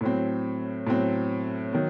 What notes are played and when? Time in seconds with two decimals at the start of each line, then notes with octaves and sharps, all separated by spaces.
0.01 A2 F#3 C4
0.87 A2 F#3 C4
1.73 D#3 F#3